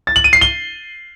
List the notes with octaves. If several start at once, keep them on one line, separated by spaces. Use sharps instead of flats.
A6
F#7
D#7
C7
G7